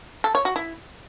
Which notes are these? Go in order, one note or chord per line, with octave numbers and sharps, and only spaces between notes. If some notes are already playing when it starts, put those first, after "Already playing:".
A4
C#5
F#4
E4